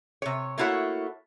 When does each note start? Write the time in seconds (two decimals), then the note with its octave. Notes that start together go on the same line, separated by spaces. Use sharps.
0.22 C3 C#5
0.58 A3 A#3 E4 F#4 C#5